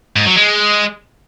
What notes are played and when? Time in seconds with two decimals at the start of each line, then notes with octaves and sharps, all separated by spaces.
0.16 G#2
0.26 F#3
0.36 G#3